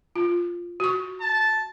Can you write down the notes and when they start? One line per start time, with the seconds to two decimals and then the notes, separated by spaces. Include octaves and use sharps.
0.16 F4
0.80 F#4 C#6
1.21 A5